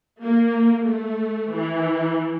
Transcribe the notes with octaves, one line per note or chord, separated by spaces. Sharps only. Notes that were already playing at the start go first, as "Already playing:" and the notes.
A#3
A3
E3